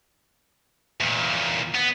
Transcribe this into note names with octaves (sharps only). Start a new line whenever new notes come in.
E2 A#2
B3